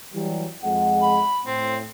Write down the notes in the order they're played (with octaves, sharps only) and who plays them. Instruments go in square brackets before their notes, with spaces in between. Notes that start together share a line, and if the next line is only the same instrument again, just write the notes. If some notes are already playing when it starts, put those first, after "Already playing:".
[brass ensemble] E3 F#3 G3
F2 G#3 F#5
[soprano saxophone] B5
[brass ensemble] A2 [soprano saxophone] C4